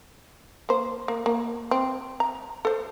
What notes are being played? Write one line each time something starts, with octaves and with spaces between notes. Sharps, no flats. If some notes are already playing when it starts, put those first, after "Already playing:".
A#3 C5
A#3
A#3
C4
A#5
A4 C5